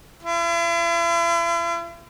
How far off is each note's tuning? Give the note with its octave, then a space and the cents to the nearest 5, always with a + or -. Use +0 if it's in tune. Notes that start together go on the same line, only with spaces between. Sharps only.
E4 +45